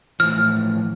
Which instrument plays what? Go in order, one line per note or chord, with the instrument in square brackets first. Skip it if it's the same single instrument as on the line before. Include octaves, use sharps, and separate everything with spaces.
[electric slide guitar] A2 E3 F3 [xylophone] F6